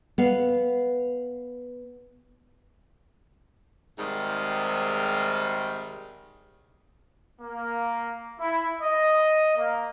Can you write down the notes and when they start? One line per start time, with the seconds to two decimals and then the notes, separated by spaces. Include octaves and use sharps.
0.18 B3 F5
3.98 G#2 C3 D#3 G3
7.41 A#3
8.39 E4
8.80 D#5
9.56 A#3